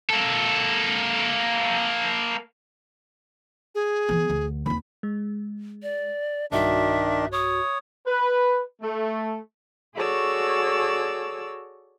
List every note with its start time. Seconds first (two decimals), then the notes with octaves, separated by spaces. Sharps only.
0.10 A#3 A4
3.75 G#4
4.09 E3 B3
4.30 D2
4.66 D#2 C4 B5
5.03 G#3
5.83 D5
6.52 B1 G2 D#3 D4 F#4 E5
7.32 C#5 D#6
8.06 B4
8.82 A3
9.96 F#4 G#4 A4 C#5 D5 E6